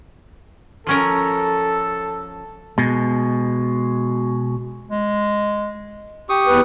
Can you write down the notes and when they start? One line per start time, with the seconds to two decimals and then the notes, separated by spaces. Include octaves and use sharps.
0.87 F3 C#4 A4 A#4
2.78 B2 G#3
4.91 G#3
6.29 G4 C#6 D#6
6.47 E2 B4